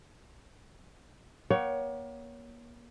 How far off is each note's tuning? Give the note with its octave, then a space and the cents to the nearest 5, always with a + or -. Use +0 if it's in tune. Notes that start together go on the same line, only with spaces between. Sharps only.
A#3 +35 C#5 +15 F#5 +45